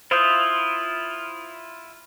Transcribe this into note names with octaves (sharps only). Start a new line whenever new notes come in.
E4 F4 C5 D#6 G6